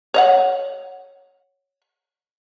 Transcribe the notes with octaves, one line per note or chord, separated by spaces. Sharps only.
C#5 D#5 F#5